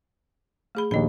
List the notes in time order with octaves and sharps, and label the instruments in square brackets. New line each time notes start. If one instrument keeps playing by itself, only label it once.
[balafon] A3 G#4 B5
[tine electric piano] A#1 D#2 [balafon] D#5 B5